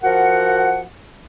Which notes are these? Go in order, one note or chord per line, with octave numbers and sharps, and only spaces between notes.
F3 F#4 A#4 F#5